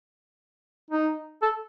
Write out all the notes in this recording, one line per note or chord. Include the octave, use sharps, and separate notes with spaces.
D#4
A4